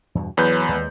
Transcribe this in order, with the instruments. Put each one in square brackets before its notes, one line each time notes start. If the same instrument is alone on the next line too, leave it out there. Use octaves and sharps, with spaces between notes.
[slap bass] E2 G2 B2
[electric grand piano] E2 B4 G6 [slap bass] F#3
[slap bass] D#2 G#3